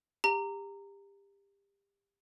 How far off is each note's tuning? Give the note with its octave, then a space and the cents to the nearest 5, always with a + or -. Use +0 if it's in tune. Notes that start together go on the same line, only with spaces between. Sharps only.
G4 +25 A#5 -15